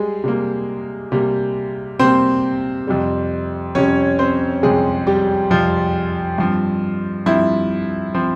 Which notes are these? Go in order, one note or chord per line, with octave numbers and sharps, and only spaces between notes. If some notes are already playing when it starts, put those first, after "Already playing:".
Already playing: G3 G#3 G#4
C3 G3 A#3
C3 G3 A#3
C3 G3 A#3 C4 C5
F2 C3 G3
F2 C3 G3 C#4 C#5
C4 C5
F2 C3 G3 G#3 G#4
G3 G4
F2 C3 F3 G3 F4
G2 F3 C4
G2 F3 C4 E4
F3 C4